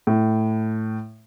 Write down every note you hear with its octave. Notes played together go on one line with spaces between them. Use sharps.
A2